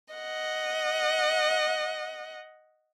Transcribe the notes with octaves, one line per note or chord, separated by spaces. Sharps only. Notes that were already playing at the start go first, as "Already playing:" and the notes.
D#5 F#5